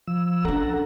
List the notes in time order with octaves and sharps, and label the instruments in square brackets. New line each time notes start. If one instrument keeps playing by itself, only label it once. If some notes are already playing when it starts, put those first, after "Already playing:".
[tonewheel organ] F3 E6
[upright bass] C#4 D4 [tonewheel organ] A4 F#5 A#5